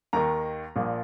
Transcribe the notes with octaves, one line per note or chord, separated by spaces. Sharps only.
D#2 D#3 A#5
A#1 A#2 F3